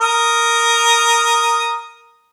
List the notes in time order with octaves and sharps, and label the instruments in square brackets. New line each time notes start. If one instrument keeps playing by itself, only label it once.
[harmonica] A#4 D#6